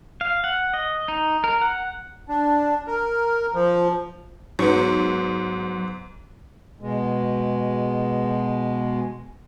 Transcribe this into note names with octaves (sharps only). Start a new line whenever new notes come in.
F5
F#5
D#5
D#4
A#4
F#5
D4
A#4
F3
G#2 F#3 B3 C#6
B2 G#3